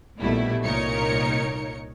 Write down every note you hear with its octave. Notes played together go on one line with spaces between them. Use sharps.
A#1 B2 G3 A3 E4
C2 A#2 D#4 A#4 C#5 C#7